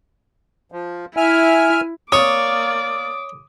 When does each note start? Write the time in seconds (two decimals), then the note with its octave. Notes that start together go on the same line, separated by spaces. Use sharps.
0.72 F3
1.17 E4 E5 G#5 F6
2.12 A#3 C#5 D5 D6 D#6